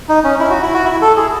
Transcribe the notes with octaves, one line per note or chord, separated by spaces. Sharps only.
D#4
C#4
E4
F#4
E4
F#4
E4
A4
G#4